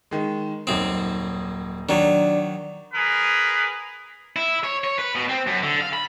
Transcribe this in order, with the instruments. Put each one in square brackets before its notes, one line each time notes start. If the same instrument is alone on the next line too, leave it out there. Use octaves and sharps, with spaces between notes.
[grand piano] D#3 G#3
[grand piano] D#1 D#4 D#6 [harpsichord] F#2 C4
[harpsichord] D#3 F#3 [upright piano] D4
[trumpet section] G#4 A#4 B4
[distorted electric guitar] E4
C#5
C#5
B4
B2
C4
F#2
D3
F5
B5